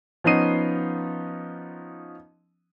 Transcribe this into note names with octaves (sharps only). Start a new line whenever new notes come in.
F3 B3 C#4 D#4 C7 D#7